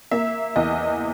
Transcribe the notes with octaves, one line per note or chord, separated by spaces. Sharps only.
A#3 E5
E2 D#5